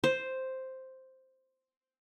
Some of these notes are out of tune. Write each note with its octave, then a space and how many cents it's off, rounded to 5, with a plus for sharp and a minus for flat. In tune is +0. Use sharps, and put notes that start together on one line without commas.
C5 +0